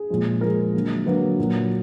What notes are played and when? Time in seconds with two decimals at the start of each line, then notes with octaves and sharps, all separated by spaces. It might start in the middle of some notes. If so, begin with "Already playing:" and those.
Already playing: G#4
0.10 A#2 F3 G#3
0.41 A#2 F3 G#3 A#4
0.74 D3 F#3 A#3
1.06 D3 F#3 A#3 B4
1.39 A#2 F#3 A#3